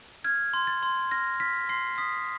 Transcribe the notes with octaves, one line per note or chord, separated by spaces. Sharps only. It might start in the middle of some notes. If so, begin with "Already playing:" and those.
F6 G#6
C6
A6
C6
F6 A#6
F6 B6
C6 C7
D#6 B6